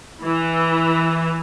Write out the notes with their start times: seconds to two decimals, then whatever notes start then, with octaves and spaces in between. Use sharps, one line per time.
0.23 E3